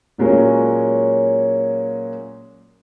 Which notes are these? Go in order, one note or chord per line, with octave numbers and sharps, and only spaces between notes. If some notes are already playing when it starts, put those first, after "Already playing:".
A#2 F#3 G#3 A#3 C#4